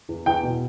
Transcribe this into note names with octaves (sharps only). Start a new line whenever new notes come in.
E2
E2 G5
B2